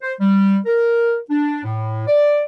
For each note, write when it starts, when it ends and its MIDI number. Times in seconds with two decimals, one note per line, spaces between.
0.02 0.13 72
0.20 0.58 55
0.66 1.18 70
1.30 1.62 62
1.64 2.03 45
2.07 2.42 74